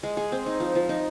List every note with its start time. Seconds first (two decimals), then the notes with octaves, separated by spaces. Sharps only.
0.03 G#3
0.17 G#4
0.32 C4
0.46 D#4
0.60 F3
0.75 F3
0.89 D#4